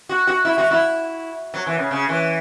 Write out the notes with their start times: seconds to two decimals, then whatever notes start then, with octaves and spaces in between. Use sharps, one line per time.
0.09 F#4
0.27 F#4
0.45 E4
0.58 F#4
0.71 E4
1.54 F#3
1.66 E3
1.78 C#3
1.91 C#3
2.09 E3